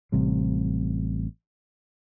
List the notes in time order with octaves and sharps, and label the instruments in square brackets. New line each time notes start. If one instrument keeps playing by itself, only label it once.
[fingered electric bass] A1 C3 G3